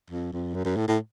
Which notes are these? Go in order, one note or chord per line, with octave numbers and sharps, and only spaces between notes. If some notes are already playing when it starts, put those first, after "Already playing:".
F2
F2
F#2
F#2
A2
A2